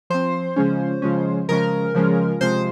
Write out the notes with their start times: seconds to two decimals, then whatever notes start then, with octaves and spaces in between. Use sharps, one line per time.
0.10 F3 C4 C5
0.56 C#3 F3 G#3 C#4
1.02 C#3 F3 G#3 C#4
1.49 C#3 F3 G#3 C#4 A#4
1.95 C#3 F3 G#3 C#4
2.41 C3 F3 G#3 C5